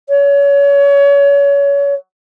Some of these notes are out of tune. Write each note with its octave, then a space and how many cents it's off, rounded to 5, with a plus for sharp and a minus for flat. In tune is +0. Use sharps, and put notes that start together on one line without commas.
C#5 +30